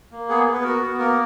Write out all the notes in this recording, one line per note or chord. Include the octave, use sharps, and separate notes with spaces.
A#3
B3 G#4
B3
B4
F#4 A#4
B3
A#3 A#4